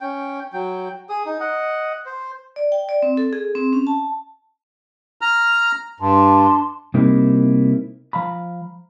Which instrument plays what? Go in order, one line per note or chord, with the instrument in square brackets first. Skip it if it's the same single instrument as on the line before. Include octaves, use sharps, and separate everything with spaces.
[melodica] C#4 G5
F#3 G5
G#4 D#6
D#4
D#5 F#5
C5
[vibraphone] D5
G5
D5
C4
A4
G#4
C4
C#4
A5
[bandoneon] A#5 F6
[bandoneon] G2 [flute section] D4 A5 C6
[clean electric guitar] C3 G3 A#3 C4 D#4 E4
F3 F5 A#5 B5